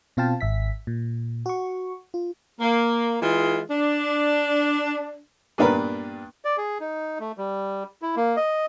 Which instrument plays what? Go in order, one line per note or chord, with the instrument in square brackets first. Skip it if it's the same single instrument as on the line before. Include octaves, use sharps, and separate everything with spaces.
[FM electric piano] B2 C4 F4 F5 G5 A5
G#1 E5 B6
A#2
F#4 C#6
F4
[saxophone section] A#3
E3 G#3 F4 G#4
D4
[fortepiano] G2 A#2 B3 D4 A#4 B4
[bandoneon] D5
G#4
D#4
A3
G3
E4
A#3
D#5